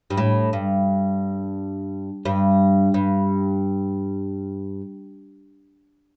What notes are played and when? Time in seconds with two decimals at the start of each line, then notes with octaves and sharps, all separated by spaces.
0.10 G2
0.17 A2
0.53 G2
2.25 G2
2.94 G2